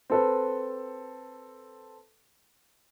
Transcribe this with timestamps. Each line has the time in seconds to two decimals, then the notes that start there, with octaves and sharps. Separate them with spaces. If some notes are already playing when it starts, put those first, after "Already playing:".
0.10 C4 A4 B4